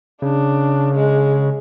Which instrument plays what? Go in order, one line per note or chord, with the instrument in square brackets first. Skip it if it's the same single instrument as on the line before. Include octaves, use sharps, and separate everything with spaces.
[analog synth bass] C#3 [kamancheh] D4
[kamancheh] G#3